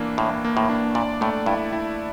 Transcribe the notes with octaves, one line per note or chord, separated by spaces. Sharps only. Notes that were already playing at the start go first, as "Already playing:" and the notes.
Already playing: E3 A#3 D4
A2 A#3
A#3
A2
D4
A#2 D5
A2 A3
G2 E4
E4